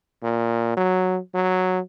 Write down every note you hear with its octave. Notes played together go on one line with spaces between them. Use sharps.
A#2
F#3
F#3